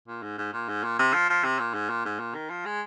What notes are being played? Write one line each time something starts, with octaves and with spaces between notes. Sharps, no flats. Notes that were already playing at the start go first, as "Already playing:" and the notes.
A#2
G#2
G#2
A#2
G#2
A#2
C3
F3
F3
C3
A#2
G#2
A#2
G#2
A#2
D#3
F3
G#3